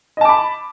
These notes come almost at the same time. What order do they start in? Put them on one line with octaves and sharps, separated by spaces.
D#5 A5 D6 B5